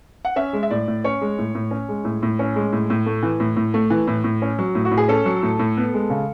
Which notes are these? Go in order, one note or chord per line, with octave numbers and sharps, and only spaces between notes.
F#5
C#4 E5
G#3
E5
A2 D5
A2
C#4 C#5
G#3
A2
A2
C#4
G#3
A2
A2
C#4
G#3
A2
A2
A3
E3
A2
A2
A3
E3
A2
A2
C#4
F#3
A2
F#4
A2
G#4
C#4 A4
F#3
A2
A2
B3
G#3
C#3